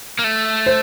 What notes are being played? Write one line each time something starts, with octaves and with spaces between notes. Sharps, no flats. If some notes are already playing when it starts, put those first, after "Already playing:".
A#3
A3
C5